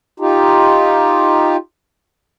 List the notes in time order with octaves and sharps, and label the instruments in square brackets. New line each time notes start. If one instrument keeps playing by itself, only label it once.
[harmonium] D#4 F4 G4